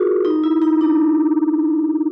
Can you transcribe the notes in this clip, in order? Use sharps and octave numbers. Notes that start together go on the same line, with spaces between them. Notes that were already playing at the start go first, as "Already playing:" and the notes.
Already playing: F4 F#4 G#4 A#4
D#4
E4
D#4
D4